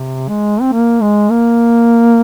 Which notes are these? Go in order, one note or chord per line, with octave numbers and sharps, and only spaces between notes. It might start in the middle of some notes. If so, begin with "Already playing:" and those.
Already playing: C3
G#3
C4
A#3
G#3
A#3